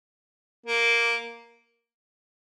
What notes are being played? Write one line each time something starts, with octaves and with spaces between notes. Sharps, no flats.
A#3